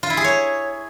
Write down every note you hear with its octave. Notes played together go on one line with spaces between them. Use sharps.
F4
E4
G#4
C#5